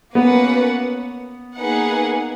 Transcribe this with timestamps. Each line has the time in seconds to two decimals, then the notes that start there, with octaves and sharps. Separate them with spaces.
0.15 A#3 B3 C#4 F#4 B4 F#5
1.57 A#3 D#4 G#4 B4 F#5